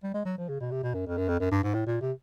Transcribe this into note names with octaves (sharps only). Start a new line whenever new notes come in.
G3
G#3
F#3
F3
C#3
B2
C3
B2
F#2
F2
F#2
F2
F#2
G2
G#2
A2
A#2
C3